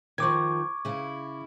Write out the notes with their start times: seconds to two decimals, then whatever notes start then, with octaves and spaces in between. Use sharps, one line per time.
0.18 D#3 F3 C#6 D6 G#6
0.85 C#3 E4